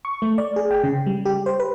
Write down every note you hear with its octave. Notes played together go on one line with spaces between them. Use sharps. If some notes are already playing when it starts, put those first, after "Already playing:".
C#6
A3
D5
G#4
G5
C#3
G3
G4
C5
B4